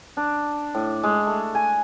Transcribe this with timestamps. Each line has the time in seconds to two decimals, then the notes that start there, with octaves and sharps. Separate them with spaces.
0.17 D4
0.75 A2
1.03 G#3
1.27 A3
1.55 G#5